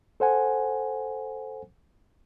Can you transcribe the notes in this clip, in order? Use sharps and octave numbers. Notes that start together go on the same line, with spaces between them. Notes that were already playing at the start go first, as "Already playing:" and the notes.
A4 C5 F#5 G#5